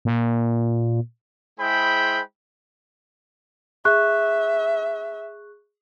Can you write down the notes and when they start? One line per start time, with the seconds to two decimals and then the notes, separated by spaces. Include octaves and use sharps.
0.05 A#2
1.59 G#3 E4 G#4 C5 G5 B5
3.85 G#4 E5 C#6 F#6